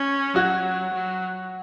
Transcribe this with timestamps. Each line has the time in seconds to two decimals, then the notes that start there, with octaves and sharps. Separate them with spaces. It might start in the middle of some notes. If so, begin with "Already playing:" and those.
Already playing: C#4 C#5
0.35 F#3 F#4
0.93 F#3